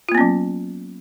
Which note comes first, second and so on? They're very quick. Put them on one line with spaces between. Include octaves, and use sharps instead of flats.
F4 A#3 B3 C#4 F#3